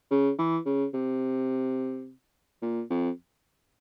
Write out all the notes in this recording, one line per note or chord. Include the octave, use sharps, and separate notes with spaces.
C#3
E3
C#3
C3
A#2
F2